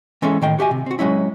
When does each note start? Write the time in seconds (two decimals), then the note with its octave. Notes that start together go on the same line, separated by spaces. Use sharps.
0.22 E3 G#3 C#4 A4 C#5 E5
0.42 A2 D#3 G5
0.59 F#4 G4 E5 G#5
0.71 C3
0.86 C4 F#4
0.99 F#3 G#3 C#4 E4